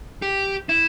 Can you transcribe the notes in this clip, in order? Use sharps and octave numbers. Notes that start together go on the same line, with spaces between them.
G4
E4